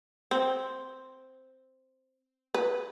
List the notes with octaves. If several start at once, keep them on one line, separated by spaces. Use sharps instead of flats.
C4
B4